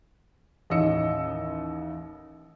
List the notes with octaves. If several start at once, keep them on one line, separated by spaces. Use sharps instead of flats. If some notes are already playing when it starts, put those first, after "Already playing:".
A1 D#2 C#4 D#5 E6 C#7